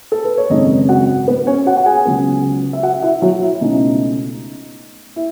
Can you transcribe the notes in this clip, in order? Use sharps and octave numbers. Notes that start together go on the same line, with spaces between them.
A4
B4
C#5
G#1 F#2 C#3 G#3 D#4 D#5
F#4 F#5
B3 B4
C#4 C#5
F#4 F#5
F#5
G#4 G#5
C#2 C#3 F#3 B3
E5
F#4 F#5
E4 E5
F#3 F#4
E4
E4
C#2 B2 A3 C#4 D#4
E4